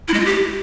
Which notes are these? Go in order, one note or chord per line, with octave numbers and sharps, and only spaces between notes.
E4
G#3
F4
G4